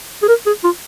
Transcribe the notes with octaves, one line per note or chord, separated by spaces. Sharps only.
G#4
A#4
G#4
F4